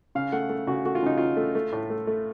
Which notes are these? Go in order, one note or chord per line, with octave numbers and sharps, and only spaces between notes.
C#3 F5
A3 F#5
A3
C#3 F#4
A3 F#4
F4
C#3 D#4
C#3 F4
A3
A3
A2
A3
A3